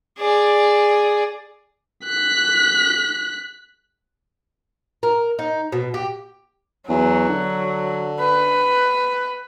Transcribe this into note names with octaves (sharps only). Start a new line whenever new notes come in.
G#4 D5
F#6 B6
A#4
D#4
B2
G4
E2 F#3
D3
B4